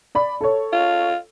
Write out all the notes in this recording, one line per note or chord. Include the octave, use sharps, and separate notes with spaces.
D5 B5
A4 C#5
F4